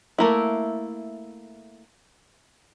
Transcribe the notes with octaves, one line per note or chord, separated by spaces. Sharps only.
A3 A#3 E4